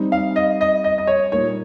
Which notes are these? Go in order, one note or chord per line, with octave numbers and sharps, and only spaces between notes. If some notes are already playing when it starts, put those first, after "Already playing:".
Already playing: G3 C4 D#4
F5
D#5
D#5
D#5
D#5
C#5
A#2 G3 A#3 D#4 C#5